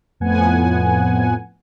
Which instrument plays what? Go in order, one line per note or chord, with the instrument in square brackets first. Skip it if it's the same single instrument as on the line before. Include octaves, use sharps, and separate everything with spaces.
[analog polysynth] F2 A2 F3 B3 F#5 G#5